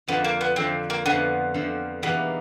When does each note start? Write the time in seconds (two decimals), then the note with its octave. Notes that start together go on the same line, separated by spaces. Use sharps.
0.08 F2 D3 F3 B3
0.25 A#3
0.41 B3
0.56 F2 D3 F3 C4
0.90 A#3
1.06 F2 D3 F3 B3
1.54 F2 D3 F3
2.02 E2 B2 G3 A#3 B3 D#4